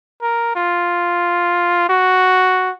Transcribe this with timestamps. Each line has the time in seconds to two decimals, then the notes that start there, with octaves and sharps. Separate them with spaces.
0.22 A#4
0.55 F4
1.89 F#4